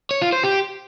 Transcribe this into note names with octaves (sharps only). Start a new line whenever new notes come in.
C#5
F4
C5
G4